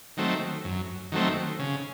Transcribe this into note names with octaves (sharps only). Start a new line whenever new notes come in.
D#3 F#3 A3 C4
F#2
D#3 F#3 A3 C4
C#3